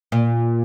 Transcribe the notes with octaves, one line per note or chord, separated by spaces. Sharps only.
A#2